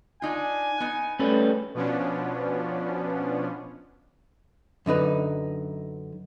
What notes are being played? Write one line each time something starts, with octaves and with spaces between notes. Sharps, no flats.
D4 D#4 F4 G#5
B3 D#4
G3 A3 C#4 B4
B2 F3 B3 C#4 D4
F#2 D3 D#4 B4